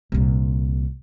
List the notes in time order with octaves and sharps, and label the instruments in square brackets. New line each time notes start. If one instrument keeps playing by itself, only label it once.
[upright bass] C2 A#2